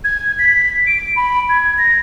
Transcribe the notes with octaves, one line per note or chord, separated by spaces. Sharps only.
G#6
B6
D7
B5
G#6
A#6